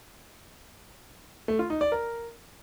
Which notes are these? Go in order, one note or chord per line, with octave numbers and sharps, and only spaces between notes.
A3
F4
D#4
D5
A#4